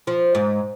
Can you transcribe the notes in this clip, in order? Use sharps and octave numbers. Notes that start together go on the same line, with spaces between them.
F3
G#2